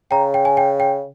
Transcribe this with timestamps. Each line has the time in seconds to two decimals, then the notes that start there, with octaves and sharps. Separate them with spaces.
0.11 C#3 G5 A#5
0.34 G5
0.45 G#5
0.57 G5
0.80 G5